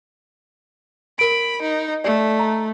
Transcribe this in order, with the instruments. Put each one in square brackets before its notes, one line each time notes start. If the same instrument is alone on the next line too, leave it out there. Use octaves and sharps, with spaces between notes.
[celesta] A#4 D7 [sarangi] B5
[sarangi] D#4
[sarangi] A3 [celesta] D5
[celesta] A#5